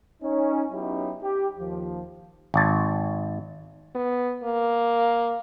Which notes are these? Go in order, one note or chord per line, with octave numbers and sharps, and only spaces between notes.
C#4 D#4
F#3 B3 C#4 D#4 E4 G4
G4
D#2 F3
G#1 A5
B3
A#3